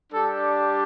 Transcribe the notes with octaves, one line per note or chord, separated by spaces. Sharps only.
G3 D4 G4 A4